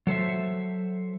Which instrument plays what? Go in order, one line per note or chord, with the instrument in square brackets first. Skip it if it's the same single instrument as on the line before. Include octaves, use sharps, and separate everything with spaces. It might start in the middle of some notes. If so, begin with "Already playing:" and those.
[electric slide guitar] F#3 A4 C5 E5